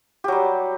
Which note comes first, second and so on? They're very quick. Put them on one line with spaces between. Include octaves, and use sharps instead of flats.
G4 F#3 G3